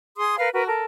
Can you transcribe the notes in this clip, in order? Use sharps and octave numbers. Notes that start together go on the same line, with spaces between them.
G#4 C6 D#6
A#4 B4 F5
F#4 A#4 B4
A4 A#4